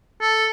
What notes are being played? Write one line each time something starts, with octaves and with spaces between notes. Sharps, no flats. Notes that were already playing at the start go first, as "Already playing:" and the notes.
A4